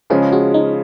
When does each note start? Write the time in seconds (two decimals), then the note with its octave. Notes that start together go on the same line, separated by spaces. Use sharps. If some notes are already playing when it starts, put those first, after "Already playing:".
0.10 C#3 F3 G#3 C#4 G#4
0.32 F#4
0.54 D#4